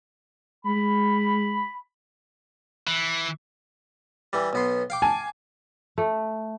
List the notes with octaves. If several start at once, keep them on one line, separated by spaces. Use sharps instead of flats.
G#3 B5
E3
E3 G3
B1 B3 C6
F5 G5 D6
G#5 A5
A3